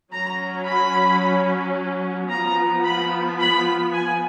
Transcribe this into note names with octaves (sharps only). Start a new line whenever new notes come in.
F#3 C#4 A#5
B5
F3 B3 A#5
B5
B5
G#5